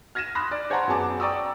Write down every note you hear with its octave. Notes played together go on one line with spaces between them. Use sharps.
F6 G#6 A#6 D#7 E7
B5 C6 D#6 F6 F#6 A#6
D5
C5 C#5 F#5 A5 A#5 C6
F#2 B3 G#4 A5 D6
D5 G5 A#5 C#6 D#6 E6